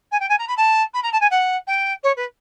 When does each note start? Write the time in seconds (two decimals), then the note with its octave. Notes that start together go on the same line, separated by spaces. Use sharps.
0.11 G#5
0.19 G5
0.29 G#5
0.38 A#5
0.47 B5
0.57 A5
0.93 B5
1.02 A#5
1.12 A5
1.20 G#5
1.30 F#5
1.67 G5
2.03 C#5
2.16 B4